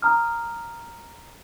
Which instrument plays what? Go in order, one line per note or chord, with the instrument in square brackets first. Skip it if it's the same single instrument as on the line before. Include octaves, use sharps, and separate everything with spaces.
[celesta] A#5 D#6 F6